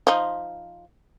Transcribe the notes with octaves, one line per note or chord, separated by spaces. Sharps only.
F3 D#4